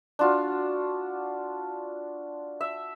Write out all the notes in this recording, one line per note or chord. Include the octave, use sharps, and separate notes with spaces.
D4 F4 F#4
E5